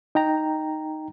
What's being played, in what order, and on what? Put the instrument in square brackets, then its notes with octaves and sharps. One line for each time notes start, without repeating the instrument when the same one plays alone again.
[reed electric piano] D#4 G5 A#5